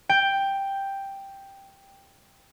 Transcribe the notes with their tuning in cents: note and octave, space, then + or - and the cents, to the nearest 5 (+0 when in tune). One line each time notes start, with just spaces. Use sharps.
G5 +5